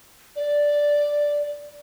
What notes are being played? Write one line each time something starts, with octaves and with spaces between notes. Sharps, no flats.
D5